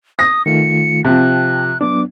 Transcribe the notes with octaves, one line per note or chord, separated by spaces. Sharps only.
D#6 A#6
D#3 A3 F4 C#7
C3 F3 G5 A5 F#6
F#3 B3 D4 D6